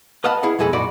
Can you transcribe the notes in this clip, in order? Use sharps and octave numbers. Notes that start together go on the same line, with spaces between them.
B4 D#5 F5 F#5 A5 B5
E4 G#4 F#5
B1 F2 G#3 G#4 A4 B5
F#2 A#2 D#4 F#4 D5 B5